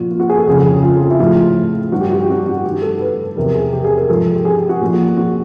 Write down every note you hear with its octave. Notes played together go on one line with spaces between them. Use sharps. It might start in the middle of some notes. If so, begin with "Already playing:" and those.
Already playing: A#2 F3 F4 F#4
F4
F#4
G#4
A4
F2 C#3 F3 G#4
F4
F4
E4
A2 F3 F4
G2 D#3 F#4
G4
F#4
G4
F#4
G4
F#4
G2 D#3 G4
A4
B4
E2 C3 F3 A#4
G#4
G4
G#4
A#4
G#2 F3 A4
G4
G#4
G4
F#4
A#2 F3
F#4